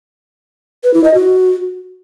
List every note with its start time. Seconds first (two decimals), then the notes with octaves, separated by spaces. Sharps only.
0.84 B4
0.94 E4
1.04 D#5
1.14 F#4